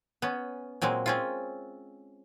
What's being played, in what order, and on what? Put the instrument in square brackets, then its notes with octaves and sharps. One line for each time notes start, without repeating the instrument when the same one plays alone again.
[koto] B3 C#4
A#2 F#3 G#3 C4
C4 C#4 F4